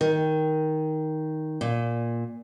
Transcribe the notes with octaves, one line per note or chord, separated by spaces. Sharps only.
D#3
A#2